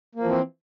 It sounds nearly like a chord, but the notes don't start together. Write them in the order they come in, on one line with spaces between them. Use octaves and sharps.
A#3 F3 E3 C4